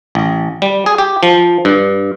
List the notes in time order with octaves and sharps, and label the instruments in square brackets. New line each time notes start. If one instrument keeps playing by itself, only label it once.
[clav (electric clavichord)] A1
G3
G#4
G4
F3
G2